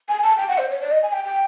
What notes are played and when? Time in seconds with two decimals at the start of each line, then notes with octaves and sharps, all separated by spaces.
0.09 G#5
0.23 A5
0.37 G5
0.48 F#5
0.58 C5
0.69 C#5
0.81 D5
0.91 D#5
1.03 G#5
1.13 G5
1.24 G5